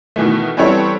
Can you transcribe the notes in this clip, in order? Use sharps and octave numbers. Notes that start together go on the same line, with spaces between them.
B2 D#3 E3 A3
E3 G3 B3 C4 A4 C#5